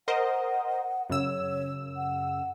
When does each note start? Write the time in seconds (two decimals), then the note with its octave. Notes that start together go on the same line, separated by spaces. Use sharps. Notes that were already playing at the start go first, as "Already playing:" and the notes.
0.08 A#4 C5 D#5 F#5
1.10 F#2 C#3 C#5 E6
1.96 F#5